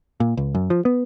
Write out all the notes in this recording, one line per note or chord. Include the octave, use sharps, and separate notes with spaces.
A#2
C#2
F#2
F3
B3